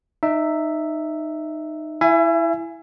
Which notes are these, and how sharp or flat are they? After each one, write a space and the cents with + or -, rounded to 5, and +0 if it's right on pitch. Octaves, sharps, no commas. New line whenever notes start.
D#4 -20 E5 +0
E4 +0 E5 +35 G#5 +0